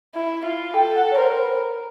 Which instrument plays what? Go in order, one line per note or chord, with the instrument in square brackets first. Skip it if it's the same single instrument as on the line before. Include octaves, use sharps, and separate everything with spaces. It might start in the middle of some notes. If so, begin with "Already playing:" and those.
[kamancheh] E4
F4
[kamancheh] A4 [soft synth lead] G5
[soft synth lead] F#5
C#5
[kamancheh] A#4 [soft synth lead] C5
[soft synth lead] B4